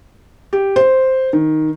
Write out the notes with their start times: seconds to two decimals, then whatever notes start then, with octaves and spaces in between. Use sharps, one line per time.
0.53 G4
0.76 C5
1.33 D#3